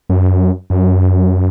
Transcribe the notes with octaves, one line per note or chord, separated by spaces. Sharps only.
F#2
F#2